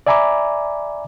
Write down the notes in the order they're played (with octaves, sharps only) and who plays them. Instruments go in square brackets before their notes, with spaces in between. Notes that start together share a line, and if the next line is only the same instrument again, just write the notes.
[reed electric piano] D5 E5 G#5 A#5 B5 D6